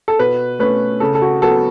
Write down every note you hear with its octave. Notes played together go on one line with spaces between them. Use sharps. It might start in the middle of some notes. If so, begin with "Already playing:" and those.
A4
B2 B4
A3 C#4 B4
C#3 A4
A4
F#4
F#3 B3 A4